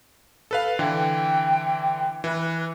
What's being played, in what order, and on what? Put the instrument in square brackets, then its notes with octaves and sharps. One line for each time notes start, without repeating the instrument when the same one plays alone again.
[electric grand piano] A4 B4 F5
[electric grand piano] D3 E3 [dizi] G5
[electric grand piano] E3 [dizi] B4